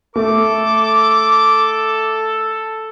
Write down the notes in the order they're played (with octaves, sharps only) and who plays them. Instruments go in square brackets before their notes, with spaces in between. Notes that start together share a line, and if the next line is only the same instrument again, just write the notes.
[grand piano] A3 [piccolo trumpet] A4 [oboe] D6